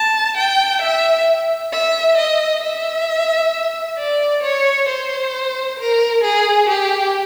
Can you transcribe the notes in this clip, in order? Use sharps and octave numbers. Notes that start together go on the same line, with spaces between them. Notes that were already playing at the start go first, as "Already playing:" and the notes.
Already playing: A5
G5
E5
E5
D#5
E5
D5
C#5
C5
A#4
G#4
G4